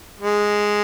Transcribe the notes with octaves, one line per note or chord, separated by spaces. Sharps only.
G#3